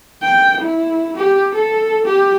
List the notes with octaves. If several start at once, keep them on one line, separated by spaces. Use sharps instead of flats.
G5
E4
G4
A4
G4